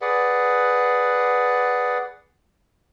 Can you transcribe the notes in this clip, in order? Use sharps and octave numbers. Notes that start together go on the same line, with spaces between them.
G#4 B4 D5 F#5